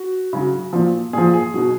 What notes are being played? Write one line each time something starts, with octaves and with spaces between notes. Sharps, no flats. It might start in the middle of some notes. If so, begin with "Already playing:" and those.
Already playing: F#4
C#3 F#3
A#2 F3
A#2 F3 G#4
G#4
B2 F#3